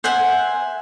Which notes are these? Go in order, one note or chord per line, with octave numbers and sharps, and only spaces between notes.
C5 E5 F#5 G#5